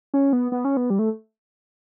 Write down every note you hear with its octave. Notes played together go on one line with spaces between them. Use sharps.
C#4
B3
B3
C#4
B3
G3
A3